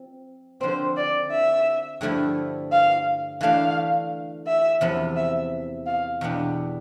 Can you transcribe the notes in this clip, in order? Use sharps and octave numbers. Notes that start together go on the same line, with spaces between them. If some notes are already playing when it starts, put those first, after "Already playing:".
Already playing: F3 C4
D3 F3 C4 C5
D5
E5
G2 D3 F3 A3 E4
F5
E3 A3 D4 F5
E5
E2 C3 F3 B3
E5
F5
E2 B2 B3 D4 G4